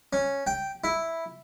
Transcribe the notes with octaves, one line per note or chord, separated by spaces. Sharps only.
C#4
G5
E4